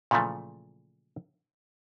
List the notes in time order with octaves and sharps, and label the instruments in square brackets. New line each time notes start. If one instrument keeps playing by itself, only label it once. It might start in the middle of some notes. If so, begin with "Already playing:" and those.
[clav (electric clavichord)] A#2 C#3 E3 F3 A3